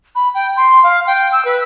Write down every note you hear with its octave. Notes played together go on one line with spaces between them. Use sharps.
B5
G5
C6
F5
G5
E6
B4